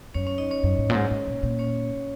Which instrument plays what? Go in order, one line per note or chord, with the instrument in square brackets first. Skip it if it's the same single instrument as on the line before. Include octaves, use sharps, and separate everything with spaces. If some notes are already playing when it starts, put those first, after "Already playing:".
[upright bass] F#2 [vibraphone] C#4 C#5
[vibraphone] C#4 C#5
D#4 D#5
C#4 C#5
[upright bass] F#2
G#2
A#2
G#2
G#2
A#2
A#2
[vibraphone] C#4 C#5